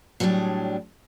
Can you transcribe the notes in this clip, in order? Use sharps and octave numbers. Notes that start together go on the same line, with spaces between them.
A2 F#3 G3 C#4 D4 G#4